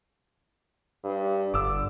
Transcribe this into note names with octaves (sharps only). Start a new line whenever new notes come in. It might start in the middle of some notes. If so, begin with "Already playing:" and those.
G2
G1 D3 D6 E6